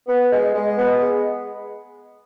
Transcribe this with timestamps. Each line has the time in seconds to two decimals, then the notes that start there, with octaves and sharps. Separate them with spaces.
0.07 B3
0.32 G#3
0.55 G#3
0.77 B3
1.01 G#3